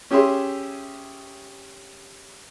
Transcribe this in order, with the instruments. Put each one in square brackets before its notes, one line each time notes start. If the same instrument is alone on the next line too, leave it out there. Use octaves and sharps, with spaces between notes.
[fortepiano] C#4 G4 G#4 E5 C6